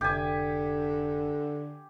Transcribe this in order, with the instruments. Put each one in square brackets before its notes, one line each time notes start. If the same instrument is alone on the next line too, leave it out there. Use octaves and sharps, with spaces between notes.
[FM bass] F1 [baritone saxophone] D3 [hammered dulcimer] G4 G#5